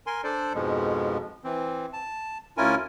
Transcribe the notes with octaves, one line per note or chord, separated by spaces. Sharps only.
A#4 G#5 C6
D4 A4 C5 D5
F2 G#2 B2 F3 G#3
E3 C4
A5
D2 C#4 E4 F4 A#4 G#5